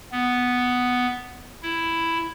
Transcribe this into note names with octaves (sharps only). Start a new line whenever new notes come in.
B3
E4